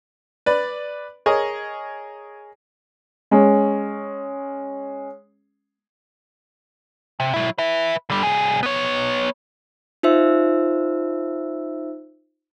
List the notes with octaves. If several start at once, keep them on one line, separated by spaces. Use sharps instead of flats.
B4 D5
G#4 A#4 C#5 D#5
G#3 C#4
C3
F#3 E4
B4 E5
D3 G3
C2 G#4
B3 C#5
D#4 F4 C5 E5 E6